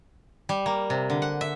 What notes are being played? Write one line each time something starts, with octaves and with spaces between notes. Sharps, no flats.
G3
A#3
C3
D3
F#5
E5